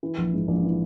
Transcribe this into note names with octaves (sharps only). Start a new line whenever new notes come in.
E3
A#1
G#2
A#1
E3